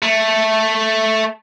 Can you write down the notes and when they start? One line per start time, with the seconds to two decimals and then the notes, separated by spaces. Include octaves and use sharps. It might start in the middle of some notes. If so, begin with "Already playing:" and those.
0.02 A3